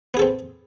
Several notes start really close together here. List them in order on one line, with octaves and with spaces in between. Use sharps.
B3 G#4 A4 C4